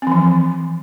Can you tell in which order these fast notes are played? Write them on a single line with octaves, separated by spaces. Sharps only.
C4 E3 F3